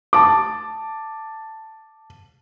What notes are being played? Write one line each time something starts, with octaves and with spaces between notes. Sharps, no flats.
A5 D6